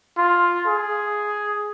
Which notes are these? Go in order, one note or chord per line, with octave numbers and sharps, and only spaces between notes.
F4
G#4